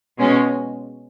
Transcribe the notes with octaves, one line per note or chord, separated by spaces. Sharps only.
B2 G#3 C#4